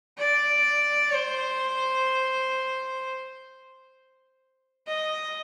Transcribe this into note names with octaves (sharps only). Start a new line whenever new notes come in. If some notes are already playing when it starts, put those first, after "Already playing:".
D5
C5
D#5